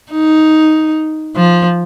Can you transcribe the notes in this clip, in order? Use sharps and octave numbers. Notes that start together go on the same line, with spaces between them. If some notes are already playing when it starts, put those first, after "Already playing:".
D#4
F3